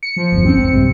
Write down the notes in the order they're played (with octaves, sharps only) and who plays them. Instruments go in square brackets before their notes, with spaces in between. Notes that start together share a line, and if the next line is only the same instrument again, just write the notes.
[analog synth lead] C#7
[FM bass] F3
[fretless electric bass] G1 E2
[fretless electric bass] F#1 D#2 C#4 [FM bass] C4
[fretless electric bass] G#1 F2
A#1 G2 C3